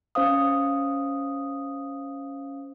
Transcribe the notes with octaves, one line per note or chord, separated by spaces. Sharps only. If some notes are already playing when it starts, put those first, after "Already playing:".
C#4 C5 F5 D#6